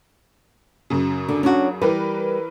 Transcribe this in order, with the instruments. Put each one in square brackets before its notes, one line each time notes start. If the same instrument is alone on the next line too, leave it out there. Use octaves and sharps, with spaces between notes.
[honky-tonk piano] F#2 C#3
[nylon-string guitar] D3
C#4 D4 F#4
[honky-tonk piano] E3 A#4 B4 [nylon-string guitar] G3